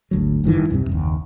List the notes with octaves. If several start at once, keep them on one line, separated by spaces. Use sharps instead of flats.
G#1 D2 F#3
F#1 G2 D#3 E3
B1 E2 G2 C3
F#1 D#2